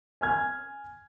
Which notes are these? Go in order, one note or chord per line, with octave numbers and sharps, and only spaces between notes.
G#5 F6 G#6